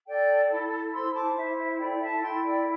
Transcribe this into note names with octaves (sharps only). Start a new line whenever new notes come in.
A4 D5 G5
E4
C5 C6 E6
A5 D6
E4 E5
E5
A4 D5 G5
E5 A5
E4 G5 C6
D5 G5